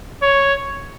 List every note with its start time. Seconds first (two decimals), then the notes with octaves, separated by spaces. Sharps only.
0.23 C#5